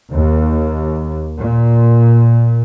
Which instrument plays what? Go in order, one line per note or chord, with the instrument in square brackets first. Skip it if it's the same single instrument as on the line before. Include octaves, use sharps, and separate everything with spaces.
[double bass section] D#2
A#2